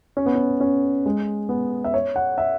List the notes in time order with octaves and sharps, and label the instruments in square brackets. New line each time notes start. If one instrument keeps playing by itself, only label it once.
[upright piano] C#4
B3
C#4
C#4
G#3
B3
E5
C#5
F#5
E5